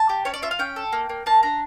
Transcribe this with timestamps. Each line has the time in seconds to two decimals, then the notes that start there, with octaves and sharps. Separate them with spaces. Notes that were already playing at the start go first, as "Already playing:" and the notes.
Already playing: A5
0.09 G4
0.25 C#4 C#5
0.34 D5
0.42 F4 E5
0.51 F5
0.59 C#4 G5
0.76 A4
0.92 A#3
1.09 A#3
1.26 A#3 A5
1.43 D4 A#5